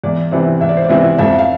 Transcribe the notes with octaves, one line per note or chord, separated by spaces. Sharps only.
E2 D5
C3 E3 B3 E4 D5
E2 E5
D5
C5
D5
C3 E3 B3 E4
F2 E5
F5